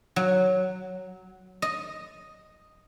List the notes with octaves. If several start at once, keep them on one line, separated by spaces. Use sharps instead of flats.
F#3
D#5